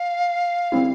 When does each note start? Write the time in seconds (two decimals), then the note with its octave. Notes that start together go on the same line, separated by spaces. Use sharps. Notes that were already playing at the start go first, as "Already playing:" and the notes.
Already playing: F5
0.72 D3 G3 C4 E4